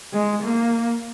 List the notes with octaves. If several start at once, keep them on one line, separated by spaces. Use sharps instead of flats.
G#3
A#3